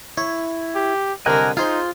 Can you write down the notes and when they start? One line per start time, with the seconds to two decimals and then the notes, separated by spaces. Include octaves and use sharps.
0.17 E4 C#5
0.75 G4
1.26 C2 D3 A#4 D#5 F#5 G#5
1.57 D#4 F4 G#4 C5 C6